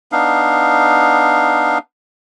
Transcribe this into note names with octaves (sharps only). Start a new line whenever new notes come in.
B3 D4 D#4 F5